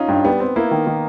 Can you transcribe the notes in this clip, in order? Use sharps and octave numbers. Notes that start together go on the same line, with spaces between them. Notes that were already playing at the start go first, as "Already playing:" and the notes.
Already playing: C#4 D#4 F4
G2
G3 B3
C4
A#3 E4
D#3
D#3